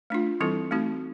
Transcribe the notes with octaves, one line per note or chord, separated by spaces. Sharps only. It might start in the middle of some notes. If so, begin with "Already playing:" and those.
A3 D4 F4
E3 G3 C4 E4 A4
A3 C4 D#4 F#4